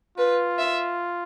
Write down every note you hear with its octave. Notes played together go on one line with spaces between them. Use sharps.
F4 B4
E5